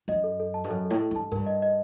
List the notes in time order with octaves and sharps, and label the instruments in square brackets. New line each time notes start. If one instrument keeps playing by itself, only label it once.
[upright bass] F#2 [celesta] D#5
[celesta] A4
A4
A5
[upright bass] G2
[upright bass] F#2 [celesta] A4
[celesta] A4
[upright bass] A2
[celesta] A4
[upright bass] G2 [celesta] A5
[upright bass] G2 [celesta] A#4
[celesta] D#5
D#5